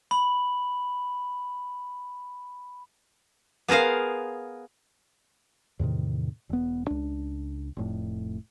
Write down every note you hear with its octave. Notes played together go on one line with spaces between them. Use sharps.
B5 F#7
B3 G#4 A#4 C5 F5
E2 A2 C3 D#3
E1 B3
C#2 D4
F1 A2